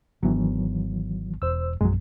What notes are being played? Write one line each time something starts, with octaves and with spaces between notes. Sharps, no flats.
G#1 D#3 E3 F#3 B3 D4
E1 C5 E6
A#1 F#2 F#3 G#3